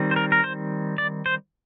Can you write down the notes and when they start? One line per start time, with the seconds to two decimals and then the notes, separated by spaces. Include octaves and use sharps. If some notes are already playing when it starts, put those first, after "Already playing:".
Already playing: D#3 G3 C4
0.11 C5
0.16 A#4
0.32 A#4
0.44 C5
0.98 D5
1.26 C5